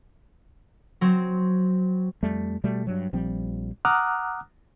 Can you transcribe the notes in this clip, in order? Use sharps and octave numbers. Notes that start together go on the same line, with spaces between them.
F#3 C4
F2 G3 A3
B2 G3 A3
G2 F#3
A#1 F3 G3 C4
F#5 A#5 D6 D#6 F6 F#6